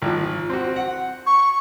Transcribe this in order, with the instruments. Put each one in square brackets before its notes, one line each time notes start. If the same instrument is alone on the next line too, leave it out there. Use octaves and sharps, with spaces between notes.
[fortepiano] G#1 F3
C4 F#4
F#5
[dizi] C#6